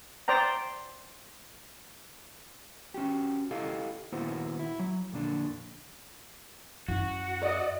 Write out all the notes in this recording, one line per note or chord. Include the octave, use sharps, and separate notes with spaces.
C5 D5 G5 A#5
C#4 F#4 G4
E4 G4 A4 D#5 F5
D#2 A#2 B3 E4 F#4 C5
E4
F#3
F2 A#2 D3 D4
F#2 E4 F#4
D5 D#5